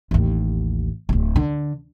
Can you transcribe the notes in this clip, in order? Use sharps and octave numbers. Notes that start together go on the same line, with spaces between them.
A1 D#2
D1 G1
D3